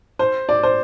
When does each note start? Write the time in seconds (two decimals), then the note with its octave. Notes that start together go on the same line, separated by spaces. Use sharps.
0.19 C5
0.49 D5
0.63 C5